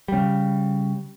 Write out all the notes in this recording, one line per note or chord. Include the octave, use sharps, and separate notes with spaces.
C#3 G3